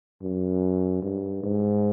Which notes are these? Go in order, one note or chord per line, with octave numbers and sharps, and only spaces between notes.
F#2
G2
G#2